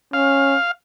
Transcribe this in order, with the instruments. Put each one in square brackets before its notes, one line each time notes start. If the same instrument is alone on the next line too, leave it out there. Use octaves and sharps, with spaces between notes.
[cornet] C#4 [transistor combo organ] F5